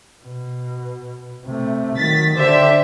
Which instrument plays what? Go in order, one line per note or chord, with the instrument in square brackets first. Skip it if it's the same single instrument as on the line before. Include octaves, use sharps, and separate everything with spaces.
[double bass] B2
C3 A3
[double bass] D#3 F#3 [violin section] A6 B6
[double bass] D3 D4 [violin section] G4 C5 E5